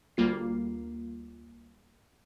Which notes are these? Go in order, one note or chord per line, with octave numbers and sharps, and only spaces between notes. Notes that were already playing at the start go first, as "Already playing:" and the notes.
D2 G3 A#3 F4 C7